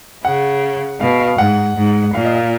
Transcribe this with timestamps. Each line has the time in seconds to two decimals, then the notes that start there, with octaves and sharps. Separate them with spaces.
0.25 C#3 F#5
1.01 B2 F5
1.20 F5
1.38 G#2 F#5
1.76 G#2
2.14 A#2 F5
2.25 D#5
2.35 F5